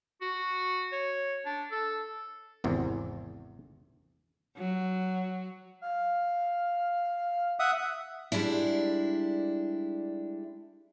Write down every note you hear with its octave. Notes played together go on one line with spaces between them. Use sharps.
F#4
C#5
D4
A4
G#1 E2 C3
F#3
F5
E5 F#5 D#6
G3 G#3 D4 E4